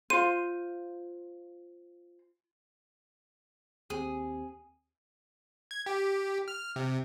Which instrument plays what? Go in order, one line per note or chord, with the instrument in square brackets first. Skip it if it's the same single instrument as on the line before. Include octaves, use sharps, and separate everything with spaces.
[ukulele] F4 C5 [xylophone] D#7
[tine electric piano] D#2 C4 G4 [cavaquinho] G#4
[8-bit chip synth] G#6
G4
F6
C3